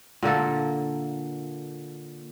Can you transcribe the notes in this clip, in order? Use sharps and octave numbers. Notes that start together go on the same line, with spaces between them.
A#2 D3 A#3 A4